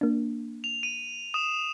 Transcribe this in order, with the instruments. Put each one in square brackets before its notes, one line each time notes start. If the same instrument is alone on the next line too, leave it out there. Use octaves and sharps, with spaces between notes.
[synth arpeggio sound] A#3 D4
[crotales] F7
D#7
D#6 E7